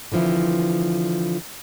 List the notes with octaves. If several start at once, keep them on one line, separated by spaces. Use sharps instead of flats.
D3 E3 F3 C4 E4